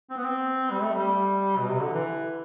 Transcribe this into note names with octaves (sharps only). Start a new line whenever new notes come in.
C4
B3
C4
G3
A3
G3
B2
C3
D3
E3